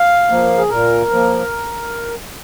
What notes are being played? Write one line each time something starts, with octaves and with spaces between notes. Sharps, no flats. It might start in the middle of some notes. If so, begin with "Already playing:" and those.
Already playing: F5
F3 A#3
G#4
A#2 A#4
F3 A#3